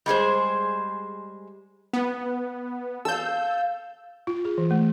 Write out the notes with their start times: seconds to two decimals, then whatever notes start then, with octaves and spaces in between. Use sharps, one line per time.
0.06 G3 G#3 G#4 C5
1.93 B3
3.05 A4 F5 E6 G6
4.27 F4
4.45 G#4
4.58 E3
4.71 A3